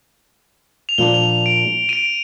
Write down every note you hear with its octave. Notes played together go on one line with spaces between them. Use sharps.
F7
A#2 F3 A#3 D4 G7
F7
F7
D7
D#7
D7